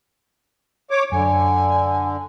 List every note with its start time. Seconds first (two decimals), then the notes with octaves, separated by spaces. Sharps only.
0.91 C#5 D6
1.12 F#2 D3 G#5